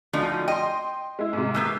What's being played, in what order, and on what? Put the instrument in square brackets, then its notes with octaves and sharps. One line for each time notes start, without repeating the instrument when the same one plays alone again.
[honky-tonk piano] D2 D3 [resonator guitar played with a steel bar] F3 A3 D#4
[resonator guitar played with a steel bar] D#5 [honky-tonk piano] G5 C6
[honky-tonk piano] G#3 E4
G#2 C3
[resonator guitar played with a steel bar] E3 A#3 B3 [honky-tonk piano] E6 G6